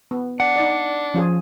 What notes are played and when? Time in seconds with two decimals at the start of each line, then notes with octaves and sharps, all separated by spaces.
0.11 B3
0.40 D4 F#5
0.56 D#4 D5
1.14 F3 C#4 F4 G#4